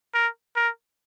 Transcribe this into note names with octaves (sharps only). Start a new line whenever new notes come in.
A#4
A#4